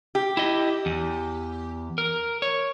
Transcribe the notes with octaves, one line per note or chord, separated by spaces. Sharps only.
G4
E4 D#5
E2
A#4
C#5